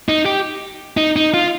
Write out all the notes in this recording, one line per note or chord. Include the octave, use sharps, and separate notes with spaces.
D#4
G4
D#4
D#4
F4